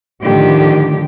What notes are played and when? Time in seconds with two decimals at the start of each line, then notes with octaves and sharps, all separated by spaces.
0.22 A2 D3 D#3 F3 G4